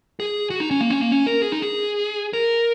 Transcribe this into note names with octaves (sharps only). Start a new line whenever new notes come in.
G#4
F#4
D#4
C#4
A#3
C#4
A#3
C#4
A#4
G#4
D#4
G#4
A#4